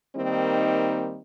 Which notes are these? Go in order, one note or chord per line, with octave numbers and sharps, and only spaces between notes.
D#3 G3 A#3 C4 D#4